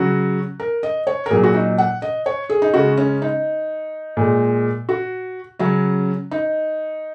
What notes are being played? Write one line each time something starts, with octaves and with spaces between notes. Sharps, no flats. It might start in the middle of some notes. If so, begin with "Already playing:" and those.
Already playing: C#3 F#3 F#4
A#4
D#5
C#5
A#4
A#2 F#3 G#4
F#4
D#4
F#5
D#5
C#5
G#4
D#4
C#3 G#3 F#4
C#4
D#4
A#2 G#3
F#4
C#3 F#3 C#4
D#4